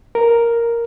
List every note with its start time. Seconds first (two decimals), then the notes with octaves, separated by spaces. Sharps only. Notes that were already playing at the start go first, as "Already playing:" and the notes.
0.15 A#4